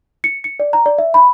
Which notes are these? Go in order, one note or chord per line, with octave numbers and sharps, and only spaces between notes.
C#7
C#7
D5
A#5
D5
E5
B5